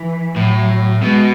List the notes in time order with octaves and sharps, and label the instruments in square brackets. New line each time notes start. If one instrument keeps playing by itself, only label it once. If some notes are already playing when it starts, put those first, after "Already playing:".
Already playing: [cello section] E3
[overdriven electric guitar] A2 [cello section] F#3
[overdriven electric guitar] B2 [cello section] G#3